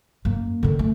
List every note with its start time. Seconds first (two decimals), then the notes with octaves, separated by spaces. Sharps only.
0.25 F#2 A#3
0.63 D3 D#3
0.79 A3